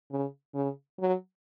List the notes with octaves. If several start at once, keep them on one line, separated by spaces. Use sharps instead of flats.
C#3
C#3
F#3